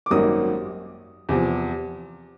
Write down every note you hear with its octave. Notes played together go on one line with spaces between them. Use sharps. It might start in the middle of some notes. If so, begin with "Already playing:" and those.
D6
G#1 F#2 D#3 G3 A#3 D#6
E2 C3 F3